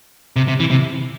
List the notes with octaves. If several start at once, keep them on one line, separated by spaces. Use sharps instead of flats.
C3
C3
E3
C3